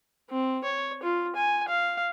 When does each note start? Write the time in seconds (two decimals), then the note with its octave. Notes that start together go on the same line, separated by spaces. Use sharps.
0.29 C4
0.64 C#5
1.03 F4
1.35 G#5
1.68 F5